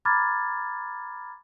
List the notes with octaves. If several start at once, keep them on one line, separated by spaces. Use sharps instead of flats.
A#5 B5 D6 F6 G#6 A6